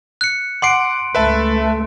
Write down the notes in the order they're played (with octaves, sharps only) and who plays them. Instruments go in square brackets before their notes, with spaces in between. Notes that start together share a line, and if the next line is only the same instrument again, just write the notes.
[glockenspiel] F#6 C#7
[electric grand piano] F#5 D6 C7 [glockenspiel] C6 D7
[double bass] C#2 A3 [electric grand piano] B4 E5 A5